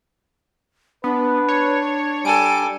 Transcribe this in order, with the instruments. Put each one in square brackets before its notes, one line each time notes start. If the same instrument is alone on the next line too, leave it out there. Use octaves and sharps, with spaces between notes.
[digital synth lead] B3 [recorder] D4 [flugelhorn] B4
[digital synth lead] C#5
[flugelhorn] G3 [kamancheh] A4 G#5 [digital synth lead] D7